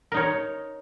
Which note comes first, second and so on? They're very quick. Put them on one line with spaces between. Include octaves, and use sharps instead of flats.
A#4 D#4 C#5